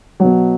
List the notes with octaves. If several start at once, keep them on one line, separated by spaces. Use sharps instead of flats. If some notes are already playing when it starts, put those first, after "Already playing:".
B2 F#3